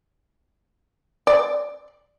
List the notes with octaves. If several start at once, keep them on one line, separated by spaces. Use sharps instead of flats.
D5